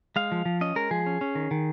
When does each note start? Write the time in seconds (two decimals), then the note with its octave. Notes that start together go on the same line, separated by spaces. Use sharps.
0.16 G#3 F5
0.32 F3
0.45 F3
0.61 C#4 D#5
0.76 G#3 A#4
0.91 F3 G#4
1.06 C#4
1.21 C#4
1.35 D#3
1.51 D#3